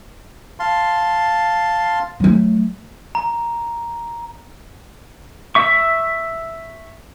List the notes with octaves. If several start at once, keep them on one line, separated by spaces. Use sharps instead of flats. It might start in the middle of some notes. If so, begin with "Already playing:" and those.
F5 A5 C6
F#3 A3
A#5
E5 C#6